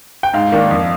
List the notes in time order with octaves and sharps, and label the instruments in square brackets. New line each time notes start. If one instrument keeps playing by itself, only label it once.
[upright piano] G5
[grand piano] G#2 [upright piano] F5
[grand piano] D#3 A#3 D4
F2